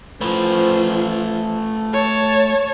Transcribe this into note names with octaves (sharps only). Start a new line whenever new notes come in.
F3 A3 B4
C#5 A5